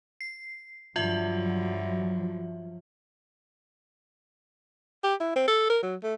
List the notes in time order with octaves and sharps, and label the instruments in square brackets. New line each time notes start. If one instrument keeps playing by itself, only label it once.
[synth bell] C7
[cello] G2 D3 [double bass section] F3 F#3 [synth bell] F4 E5
[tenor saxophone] G4
E4
C4
A4
A#4
F#3
A3